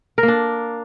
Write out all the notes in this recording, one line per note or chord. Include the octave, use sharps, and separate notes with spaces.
A#4
A#3
D4